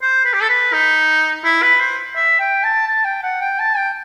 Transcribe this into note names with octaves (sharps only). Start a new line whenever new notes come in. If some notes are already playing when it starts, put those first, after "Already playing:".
C5
B4
G4
A4
B4
D#4
E4
B4
C5
E5
G5
A5
A5
G5
F#5
G5
A5
G5